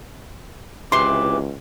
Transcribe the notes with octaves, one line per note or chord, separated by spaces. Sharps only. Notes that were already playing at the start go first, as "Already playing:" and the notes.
C#2 C3 E3 C6 D6